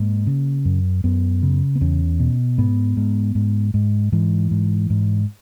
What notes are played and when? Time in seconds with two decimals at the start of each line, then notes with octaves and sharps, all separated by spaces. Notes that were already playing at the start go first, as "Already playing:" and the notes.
Already playing: G#2 A#3
0.27 C#3
0.65 F#2
1.04 F#2 B3
1.43 C#3
1.75 B3
1.81 E2 C#4
2.20 B2
2.58 G#2 B3
2.97 G#2
3.35 G#2
3.74 G#2
4.12 G#2 E3
4.51 G#2
4.90 G#2